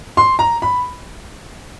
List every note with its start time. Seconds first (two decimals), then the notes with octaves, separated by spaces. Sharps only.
0.17 C6
0.39 A#5
0.62 B5